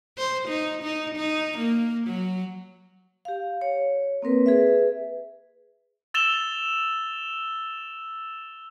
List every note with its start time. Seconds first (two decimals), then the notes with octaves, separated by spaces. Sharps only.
0.18 C5
0.48 D#4
0.83 D#4
1.15 D#4
1.58 A#3
2.07 F#3
3.25 G4 F5
3.62 C#5
4.22 A#3 C4 A#4 B4
4.46 G#4 B4 E5
6.14 E6 A6 E7 F7 G7